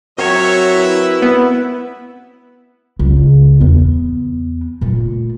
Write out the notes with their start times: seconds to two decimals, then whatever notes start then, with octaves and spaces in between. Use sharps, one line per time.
0.18 F#3 C4 F#4 A#4 C#5 E5
0.74 E4 B4
1.22 B3
2.99 C#2
3.60 E2 B3
4.81 A#2 A3